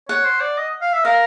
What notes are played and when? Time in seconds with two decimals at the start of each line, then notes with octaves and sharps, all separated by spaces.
0.09 C#5 F#5
0.25 C5
0.41 D5
0.58 D#5
0.81 F5
0.93 E5
1.05 A#4 F5